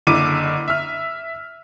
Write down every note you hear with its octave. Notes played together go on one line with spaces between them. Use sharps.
F#1 D3 E4 D6 D#7
E5 F6